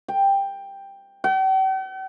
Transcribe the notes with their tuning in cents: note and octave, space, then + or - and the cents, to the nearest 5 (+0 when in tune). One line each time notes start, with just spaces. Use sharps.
G5 +10
G5 -45